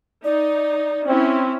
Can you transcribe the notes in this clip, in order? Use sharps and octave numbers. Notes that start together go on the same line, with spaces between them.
D#4 D5
C4 C#4 E4